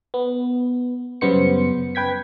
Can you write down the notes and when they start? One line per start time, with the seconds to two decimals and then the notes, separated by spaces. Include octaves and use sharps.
0.14 B3
1.21 F#2 C#3 G3 B3 C5 C#7
1.95 B4 G5 G#6 B6